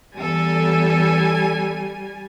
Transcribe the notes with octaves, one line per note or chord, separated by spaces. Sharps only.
E2 G3 A4 G#5